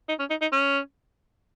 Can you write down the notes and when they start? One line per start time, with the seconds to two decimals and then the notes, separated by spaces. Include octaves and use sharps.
0.09 D#4
0.19 C#4
0.30 D#4
0.42 D#4
0.52 C#4